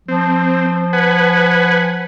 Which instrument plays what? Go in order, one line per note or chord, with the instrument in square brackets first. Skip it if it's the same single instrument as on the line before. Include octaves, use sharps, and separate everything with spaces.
[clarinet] F3 [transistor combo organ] C4
[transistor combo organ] B4 F#5 G#5